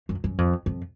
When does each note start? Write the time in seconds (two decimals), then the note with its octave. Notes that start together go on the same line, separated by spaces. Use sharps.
0.09 F#2
0.24 F#2
0.38 F2
0.66 F2